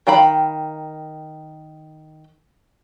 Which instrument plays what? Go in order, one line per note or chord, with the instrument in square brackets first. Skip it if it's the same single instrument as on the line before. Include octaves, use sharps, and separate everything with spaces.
[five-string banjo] D#3 F5 G5 A#5 B5